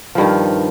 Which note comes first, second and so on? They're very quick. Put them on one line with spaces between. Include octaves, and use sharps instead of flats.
F3 G2 D#3